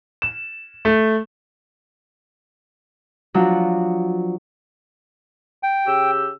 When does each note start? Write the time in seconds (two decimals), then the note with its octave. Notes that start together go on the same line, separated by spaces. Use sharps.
0.22 E7
0.85 A3
3.34 F3 F#3 D4
5.63 G5
5.87 C#3 G4 E6